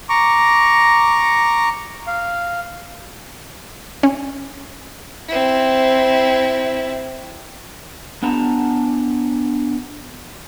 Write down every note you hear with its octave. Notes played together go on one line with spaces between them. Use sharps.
A#5 C#6 D6
F5
C#4
C4 E4
B3 D4 F#5 A5 A#5